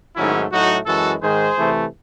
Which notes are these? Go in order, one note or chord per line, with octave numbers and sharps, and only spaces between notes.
G#2 D#3 F#3 A3 C#4 E4
A2 F#3 A3 D#4 F#4
F#2 E3 G#3 F#4 A4
G#2 D#3 G#3 G#4 C5
C3 E3 A3